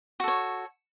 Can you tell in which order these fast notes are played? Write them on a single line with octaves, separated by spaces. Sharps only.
F#4 A4 C#5